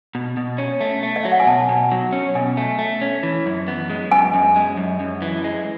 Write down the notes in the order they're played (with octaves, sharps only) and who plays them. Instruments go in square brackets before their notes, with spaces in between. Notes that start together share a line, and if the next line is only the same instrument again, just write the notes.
[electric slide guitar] B2
B2
C#4
A3
A3
[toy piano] D#5
[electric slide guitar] F#3 [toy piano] E5
[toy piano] F#5
G#5
[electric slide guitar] B2 [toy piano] A5
[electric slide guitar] B2
F#3
C#4
[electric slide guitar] B2 [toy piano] G#5
[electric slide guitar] A3
A3
C#4
E3
F#2
B3
G#3
[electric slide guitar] F#2 [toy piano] G#5
[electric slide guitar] F#2
G#3
F#2
F#2
E3
G#3